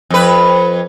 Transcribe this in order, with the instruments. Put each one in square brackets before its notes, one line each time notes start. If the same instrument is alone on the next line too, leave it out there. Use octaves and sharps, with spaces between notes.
[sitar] F2 B4